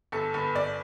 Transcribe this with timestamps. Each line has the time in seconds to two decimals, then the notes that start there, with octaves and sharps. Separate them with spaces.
0.12 G1 A4
0.34 G1 B4
0.55 G1 D5